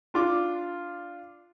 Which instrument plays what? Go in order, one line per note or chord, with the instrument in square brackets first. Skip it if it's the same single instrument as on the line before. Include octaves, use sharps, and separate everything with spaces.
[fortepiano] D4 F4 D6